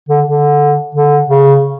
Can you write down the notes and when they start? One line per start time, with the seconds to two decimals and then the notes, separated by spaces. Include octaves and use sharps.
0.09 D3
0.26 D3
0.95 D3
1.30 C#3